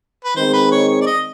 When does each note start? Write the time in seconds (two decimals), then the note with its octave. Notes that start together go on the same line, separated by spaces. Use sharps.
0.24 B4
0.36 D#3 G#3 C4 C5
0.53 B4
0.72 C#5
0.89 C#5
1.01 D5
1.07 D#5